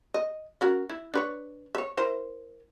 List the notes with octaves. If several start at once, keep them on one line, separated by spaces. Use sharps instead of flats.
D#5
C#4 F#4 A#4
E4
D4 B4 C#5
C#5 E5
E4 A#4 C5